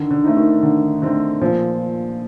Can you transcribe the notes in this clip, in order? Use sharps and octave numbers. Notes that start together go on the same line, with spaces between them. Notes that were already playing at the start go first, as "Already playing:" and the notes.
Already playing: D3 D#3
D3
A3 C4 D#4
D#3
D3 D#3
D3 A3 C4 D#4
A#2 F3